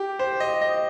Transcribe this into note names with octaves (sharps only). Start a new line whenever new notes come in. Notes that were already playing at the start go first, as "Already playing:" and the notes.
Already playing: G4
C5
D#5
D#5